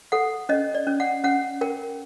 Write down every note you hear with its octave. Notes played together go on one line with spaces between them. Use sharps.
A4 F#5
C#4 D#5
D5
C#4
F#5
C#4 F#5
A#4 G5